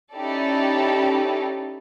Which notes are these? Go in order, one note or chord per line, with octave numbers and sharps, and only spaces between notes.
C#4 D#4 E4 G4 A4 D5